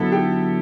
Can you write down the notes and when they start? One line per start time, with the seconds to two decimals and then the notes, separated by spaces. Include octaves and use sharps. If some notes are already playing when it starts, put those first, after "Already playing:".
Already playing: D3 F#3 B3 E4 A4
0.12 G4